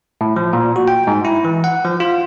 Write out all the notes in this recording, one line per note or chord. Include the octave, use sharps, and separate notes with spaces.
A2
F3
A#2
F#4
G5
G#2
E4
E3
F#5
F3
F4